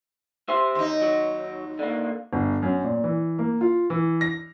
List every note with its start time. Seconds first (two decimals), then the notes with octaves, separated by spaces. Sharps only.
0.49 G4 C5 E5
0.75 D#2 D#4
1.02 F#3
1.79 D3 A#3
2.33 G1
2.62 F#2
2.84 A#2
3.04 E3
3.39 A#3
3.61 F4
3.90 E3
4.21 A#6